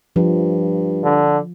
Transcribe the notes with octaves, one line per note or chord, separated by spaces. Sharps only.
G2 F3
D3